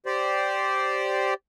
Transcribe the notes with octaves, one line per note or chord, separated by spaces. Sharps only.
G4 C5 D5